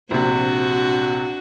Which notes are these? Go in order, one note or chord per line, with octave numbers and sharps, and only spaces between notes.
A#1 C3 D4 F#4